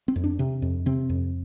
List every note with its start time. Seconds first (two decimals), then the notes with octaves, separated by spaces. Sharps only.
0.08 C4
0.16 F2
0.24 D4
0.39 C3
0.62 F2
0.86 C3 C4
1.10 F2